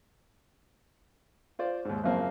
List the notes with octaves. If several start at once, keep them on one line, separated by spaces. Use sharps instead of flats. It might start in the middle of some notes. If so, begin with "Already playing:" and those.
F4 C5 D5
D#2 G#2
F#2 C#3 F3 A#3 C4